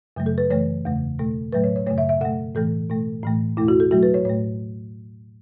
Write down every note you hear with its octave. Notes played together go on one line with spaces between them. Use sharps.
F#2 C#3 F#3 A3
A4
B4
F#2 E3 A3 C#5
E2 C#3 A3
B2 A3
A2 F#3 A3 B4
C#5
C#5
F#2 C#3 A3 C#5
E5
E5
B2 A3 F#5
A2 E3 A3 A4
B2 A3
A2 E3 A3
E2 B2 A3 E4
F#4
A4
B2 F#3 A3 F#4
B4
C#5
A2 A3 C#5